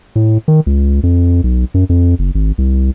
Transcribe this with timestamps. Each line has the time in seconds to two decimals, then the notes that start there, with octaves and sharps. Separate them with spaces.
0.16 A2
0.48 D#3
0.66 C#2
1.03 F2
1.44 B1
1.74 F#2
1.89 F2
2.19 F#1
2.35 G#1
2.58 C2